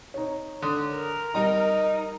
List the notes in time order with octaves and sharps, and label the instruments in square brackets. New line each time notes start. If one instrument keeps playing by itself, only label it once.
[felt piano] D#4 C#5
[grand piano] D3 D#6
[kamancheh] A#4
[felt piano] G3 [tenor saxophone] D#4 [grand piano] A#5